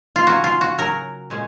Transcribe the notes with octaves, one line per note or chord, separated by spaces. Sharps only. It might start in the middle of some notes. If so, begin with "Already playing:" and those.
F4
C#3 F#3 C#4 F#4
F4
F#4
C#3 F#3 C#4 A#4
A#2 G#3 C#4